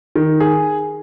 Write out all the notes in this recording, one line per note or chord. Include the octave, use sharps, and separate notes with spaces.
D#3
G#4